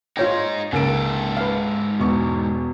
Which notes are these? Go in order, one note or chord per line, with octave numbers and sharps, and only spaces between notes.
G#3 D#4 F4 C#5 G5
C#2 G#2 A#3 A4 D7
B4 F5
E1 E2 C#6